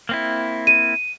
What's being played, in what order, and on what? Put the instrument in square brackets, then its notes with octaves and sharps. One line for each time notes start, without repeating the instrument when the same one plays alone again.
[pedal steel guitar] A#3 C4 E4
[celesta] D#7